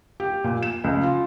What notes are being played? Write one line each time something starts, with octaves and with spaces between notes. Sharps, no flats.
G4
A#2
E7
C#2
F4